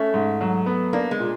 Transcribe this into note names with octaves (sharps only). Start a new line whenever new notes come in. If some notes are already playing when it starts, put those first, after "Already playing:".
Already playing: A3 C#4
G#2
F#3
B3
A#3 D4
G#3
A#2